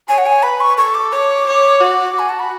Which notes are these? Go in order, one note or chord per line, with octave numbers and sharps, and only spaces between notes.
C#5 G#5
F#5
G#5
B4 B5
C#6
A4 C#6
D6
C#5 D6
C#5
F#4
F#4 G#5
A5
B5